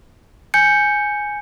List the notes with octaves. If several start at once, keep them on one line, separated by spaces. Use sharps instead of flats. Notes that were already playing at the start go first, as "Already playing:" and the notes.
G#5 G6 C#7